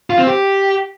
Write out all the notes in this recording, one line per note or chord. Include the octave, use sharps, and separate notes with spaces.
F4
C4
G4